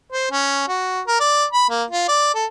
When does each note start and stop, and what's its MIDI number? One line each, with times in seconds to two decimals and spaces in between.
0.12 0.29 72
0.31 0.64 61
0.68 1.00 66
1.07 1.16 70
1.20 1.45 74
1.53 1.66 83
1.69 1.83 58
1.90 2.07 65
2.08 2.32 74
2.34 2.45 69